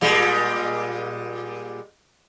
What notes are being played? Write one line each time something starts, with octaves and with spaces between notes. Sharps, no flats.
A#2 G3 G#3